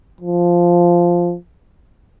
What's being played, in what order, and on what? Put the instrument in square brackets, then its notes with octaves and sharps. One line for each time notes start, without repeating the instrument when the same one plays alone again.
[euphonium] F3